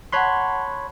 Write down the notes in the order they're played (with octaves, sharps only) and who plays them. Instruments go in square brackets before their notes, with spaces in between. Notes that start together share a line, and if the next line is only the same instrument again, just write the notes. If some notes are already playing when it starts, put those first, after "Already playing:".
[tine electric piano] C#5 B5 C6 [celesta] F#5 A5 F#6